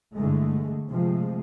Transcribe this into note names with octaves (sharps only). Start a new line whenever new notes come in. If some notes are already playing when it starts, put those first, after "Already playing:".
G2 D3 E3 G#3 A3
C3 F3 G#3 A3